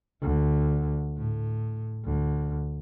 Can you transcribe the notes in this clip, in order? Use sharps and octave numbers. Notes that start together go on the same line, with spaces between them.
D2
A2
D2